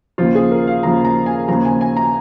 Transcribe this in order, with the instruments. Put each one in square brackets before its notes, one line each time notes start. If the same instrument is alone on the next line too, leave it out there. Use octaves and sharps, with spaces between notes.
[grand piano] D#2 C#3 F3 [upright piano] F4
[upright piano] G#4
A#4
F5
[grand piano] D#2 C#3 F3 [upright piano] A#5
[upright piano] A#5
G#5
[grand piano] D#2 C#3 F3 [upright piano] A#5
[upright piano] G#5
G#5
A#5